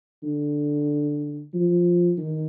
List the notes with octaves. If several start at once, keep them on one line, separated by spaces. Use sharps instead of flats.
D3
F3
D#3